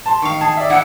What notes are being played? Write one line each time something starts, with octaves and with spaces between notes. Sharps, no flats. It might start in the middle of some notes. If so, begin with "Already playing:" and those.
A5 C6
D#3 F5 C#6
G#4 A5
D5 E5
E4 F#5